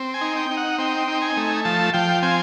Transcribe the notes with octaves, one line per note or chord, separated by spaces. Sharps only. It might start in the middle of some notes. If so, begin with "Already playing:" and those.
Already playing: C4
G#5
D#4
G5
D#4
F#5
C4 G5
D#4
G#5
A3
F3 A5
F3 G5
C4 G#5